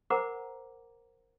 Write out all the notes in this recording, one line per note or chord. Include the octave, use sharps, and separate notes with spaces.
A#4 C5 F#5 G#5 A#5 D6